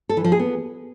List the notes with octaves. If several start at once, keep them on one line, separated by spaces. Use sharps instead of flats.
A4
E3
F3
G#4
B3